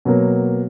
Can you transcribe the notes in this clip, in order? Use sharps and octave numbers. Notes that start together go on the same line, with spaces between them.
B2 F#3 A#3